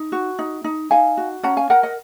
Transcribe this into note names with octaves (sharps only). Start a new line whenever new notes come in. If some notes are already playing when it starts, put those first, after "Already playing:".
Already playing: D#4
F#4
D#4
D#4
D#4 F5 G#5
F#4
C#4 F#5 A#5
F5 G#5
A#4 F#5 A#5
D#5 F#5